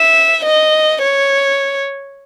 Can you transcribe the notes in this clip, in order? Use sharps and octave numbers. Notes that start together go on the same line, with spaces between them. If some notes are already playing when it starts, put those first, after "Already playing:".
Already playing: E5
D#5
C#5